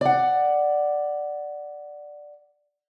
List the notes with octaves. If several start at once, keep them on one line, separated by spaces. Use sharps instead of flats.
D5 F#5